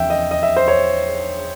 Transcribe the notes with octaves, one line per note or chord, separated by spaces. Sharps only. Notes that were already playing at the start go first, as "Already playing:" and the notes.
Already playing: E2 C#3 F3 E5 G5
D#5
D#5
E5
C5
C#5